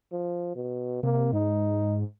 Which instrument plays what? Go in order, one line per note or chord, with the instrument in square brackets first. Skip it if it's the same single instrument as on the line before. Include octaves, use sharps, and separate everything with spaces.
[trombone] F3
B2
[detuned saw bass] C3 [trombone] A#3
[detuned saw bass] G#2 [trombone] D#4